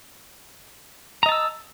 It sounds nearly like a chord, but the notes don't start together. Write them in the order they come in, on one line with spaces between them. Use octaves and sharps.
A#5 D#5 A5 E6